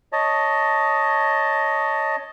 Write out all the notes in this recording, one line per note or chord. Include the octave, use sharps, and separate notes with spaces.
C#5 D#5 A5